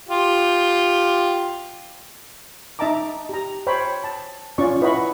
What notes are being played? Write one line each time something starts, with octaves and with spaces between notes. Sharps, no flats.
F4 G4
D#4 D#5 E5 A5 A#5 D6
G4 A#5
C5 C#5 G5 B5
A5
C#4 F4 D5 C#6
E4 B4 D#5 F#5 B5 C#6